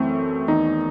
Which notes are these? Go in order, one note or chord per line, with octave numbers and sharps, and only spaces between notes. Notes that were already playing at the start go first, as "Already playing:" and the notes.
Already playing: F#2 E3 A3 C4
E2 D#3 D#4